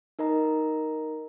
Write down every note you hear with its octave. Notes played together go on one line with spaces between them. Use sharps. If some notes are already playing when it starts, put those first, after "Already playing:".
D#4 A#4 D#5 A#5